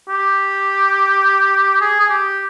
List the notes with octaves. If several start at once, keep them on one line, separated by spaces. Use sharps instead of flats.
G4
G#4
G#4
G4